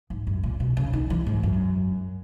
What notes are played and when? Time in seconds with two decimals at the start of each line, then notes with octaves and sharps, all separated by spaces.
0.10 G#2
0.27 F#2
0.43 A#2
0.60 B2
0.77 C#3
0.93 D#3
1.10 E3
1.27 G#2
1.43 F#2